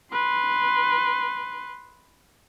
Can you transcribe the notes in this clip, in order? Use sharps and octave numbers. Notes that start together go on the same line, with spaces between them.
B4 C6